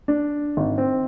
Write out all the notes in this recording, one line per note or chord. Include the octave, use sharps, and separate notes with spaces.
D4
G#1
C4